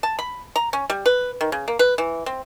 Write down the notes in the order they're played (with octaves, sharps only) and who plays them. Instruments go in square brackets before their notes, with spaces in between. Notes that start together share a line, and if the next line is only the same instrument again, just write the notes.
[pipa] A5
B5
A#5
C#4
G3
B4
D#3
C#3
A#3
B4
E3
C4